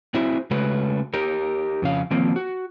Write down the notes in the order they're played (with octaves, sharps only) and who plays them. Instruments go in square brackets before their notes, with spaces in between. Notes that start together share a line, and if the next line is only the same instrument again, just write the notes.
[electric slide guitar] C4 E4 F#4 G#4 C5 E5
C#3 G#3 A3 F#4 B4
D#4 G4 A#4
F2 C#3 F5
D#3 F3 A#3 C4
F#4